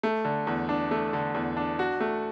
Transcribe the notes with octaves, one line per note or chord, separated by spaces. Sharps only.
A3
D3
E2
D4
A3
D3
E2
D4
F#4
A3